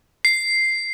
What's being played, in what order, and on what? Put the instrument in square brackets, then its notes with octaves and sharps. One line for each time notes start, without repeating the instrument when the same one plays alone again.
[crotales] C7